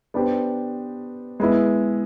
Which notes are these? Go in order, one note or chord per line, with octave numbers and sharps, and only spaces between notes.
B3 D4 G4 C5
G#3 B3 E4